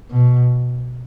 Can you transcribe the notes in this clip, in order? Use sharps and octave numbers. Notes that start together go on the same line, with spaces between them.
B2